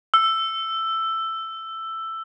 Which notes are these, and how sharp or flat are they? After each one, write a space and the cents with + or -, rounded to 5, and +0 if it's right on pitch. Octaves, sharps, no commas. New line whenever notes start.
E6 +10